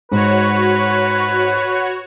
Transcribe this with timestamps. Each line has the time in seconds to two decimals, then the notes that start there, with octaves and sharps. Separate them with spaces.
0.12 G#2 F#4 B4 C#5